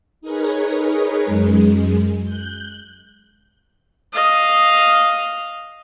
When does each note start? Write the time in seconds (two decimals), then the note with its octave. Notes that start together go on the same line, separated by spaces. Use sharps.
0.21 D#4 G#4 A#4 B4 C#5
1.25 F#2 G#3
2.24 F#6 G6
4.13 D#5 F5